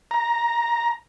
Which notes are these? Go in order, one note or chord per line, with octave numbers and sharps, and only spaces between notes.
A#5